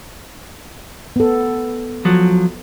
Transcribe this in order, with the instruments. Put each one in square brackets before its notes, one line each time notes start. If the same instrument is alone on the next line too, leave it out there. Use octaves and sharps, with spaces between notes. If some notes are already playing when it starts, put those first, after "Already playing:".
[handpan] B3 A4
[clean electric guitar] F3 F#3